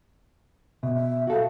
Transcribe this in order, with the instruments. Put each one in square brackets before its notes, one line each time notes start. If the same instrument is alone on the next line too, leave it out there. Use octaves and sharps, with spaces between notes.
[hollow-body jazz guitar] B2 [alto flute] E5
[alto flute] E5
[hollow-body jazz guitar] F#4 A4 [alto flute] F5